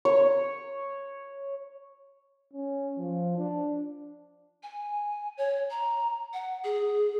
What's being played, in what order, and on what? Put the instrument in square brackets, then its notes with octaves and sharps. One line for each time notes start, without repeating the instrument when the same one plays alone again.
[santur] C#5
[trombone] C#4
F3
D4
[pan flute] G#5
C#5
A#5
F#5
G#4